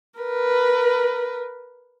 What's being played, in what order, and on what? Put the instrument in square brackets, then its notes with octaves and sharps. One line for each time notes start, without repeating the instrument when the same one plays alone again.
[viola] A#4 B4